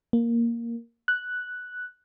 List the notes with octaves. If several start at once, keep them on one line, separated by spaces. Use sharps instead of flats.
A#3
F#6